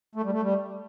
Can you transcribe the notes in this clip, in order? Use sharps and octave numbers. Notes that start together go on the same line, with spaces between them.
A3
G3
A3
G3